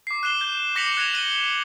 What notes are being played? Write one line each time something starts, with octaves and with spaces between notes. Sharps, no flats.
D6 C7
F#6 C7 E7 G7
G6
D6 A#6 B6 C#7 F7 F#7
F#6 G#6 A#6 D#7 F7
F#6 A#6 D#7 G7